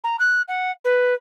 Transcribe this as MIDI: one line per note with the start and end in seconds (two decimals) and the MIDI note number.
0.04 0.16 82
0.19 0.42 90
0.48 0.71 78
0.84 1.14 71